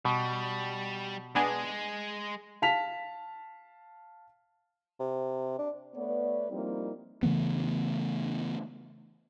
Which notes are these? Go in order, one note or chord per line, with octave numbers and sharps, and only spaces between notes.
B2 G3
G#3 B3 D4 G#4
F5 A5 B6 F7
C3
D4
A3 B3 B4 C#5 D5
F3 G3 A#3 C4 D#4 E4
C#3 E3 A3 B3